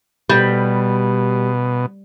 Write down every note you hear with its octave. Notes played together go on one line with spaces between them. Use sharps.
B2 G3